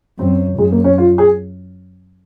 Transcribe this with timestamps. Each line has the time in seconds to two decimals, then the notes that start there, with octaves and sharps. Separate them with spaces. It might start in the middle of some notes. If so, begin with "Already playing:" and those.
0.19 F#2 C4
0.58 F#2 G#3
0.72 A#3
0.84 C#4
0.98 F4
1.18 G#4